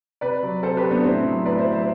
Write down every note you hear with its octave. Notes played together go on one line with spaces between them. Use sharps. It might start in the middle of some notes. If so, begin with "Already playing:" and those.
C3 B4 D5
F#3
C3 A4 C5
G4 B4
F#3
B3 D4
A2 C4 E4
F#3
A2 B4 D5
C5 E5
F#3
C5 E5